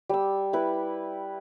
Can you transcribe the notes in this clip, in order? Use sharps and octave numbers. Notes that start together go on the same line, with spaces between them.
G3 E6
E4 B4